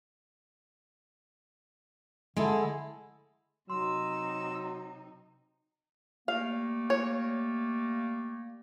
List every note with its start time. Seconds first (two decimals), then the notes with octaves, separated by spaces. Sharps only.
2.37 D3 G#3 E4 G#4 A4
3.70 C3 F#3 D#4 C6 E6
6.28 G3 A3 A#3 F5
6.90 C#5